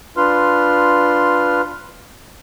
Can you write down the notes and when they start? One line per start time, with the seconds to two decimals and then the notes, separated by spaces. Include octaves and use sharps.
0.17 D4 F4 B4 C6 F6